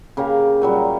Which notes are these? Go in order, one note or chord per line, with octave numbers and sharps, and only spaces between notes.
C#3 A#3 G4 A#5
A#2 F#3 G3